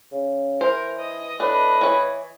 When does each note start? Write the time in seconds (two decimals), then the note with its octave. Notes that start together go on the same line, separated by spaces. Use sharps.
0.11 C#3
0.61 E3 A#4 C5
0.99 D#5
1.40 A2 D4 B4
1.81 E3 C#5